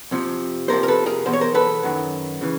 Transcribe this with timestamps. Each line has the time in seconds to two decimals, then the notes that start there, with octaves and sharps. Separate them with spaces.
0.11 F2 C3 F3
0.68 F2 C3 F3 A#4 C5
0.83 A#4
0.88 A4 B4
1.06 G#4 A#4
1.25 E2 B2 F#3 C5
1.33 C#5
1.41 A#4 C5
1.54 A4 B4
1.83 F#2 D#3 F#3
2.41 C#3 E3